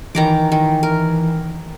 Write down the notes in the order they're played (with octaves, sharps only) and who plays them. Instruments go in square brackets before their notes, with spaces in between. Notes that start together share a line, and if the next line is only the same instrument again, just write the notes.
[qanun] D#3 A#5 D6 [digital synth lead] E3
[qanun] D#3
A#4